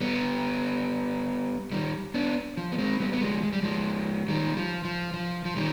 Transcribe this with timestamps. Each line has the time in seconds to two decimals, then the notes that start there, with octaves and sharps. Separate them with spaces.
0.01 G3 B3
1.72 D#3 G3
2.14 B3 D4
2.57 F3
2.72 B3
2.78 G#3 C4
3.00 G3 B3
3.13 B3
3.21 F3 G#3
3.43 G#3
3.53 G3
3.63 F3 G#3
4.28 D#3 G3
4.57 F3
4.85 F3
5.14 F3
5.45 F3
5.56 D#3 G3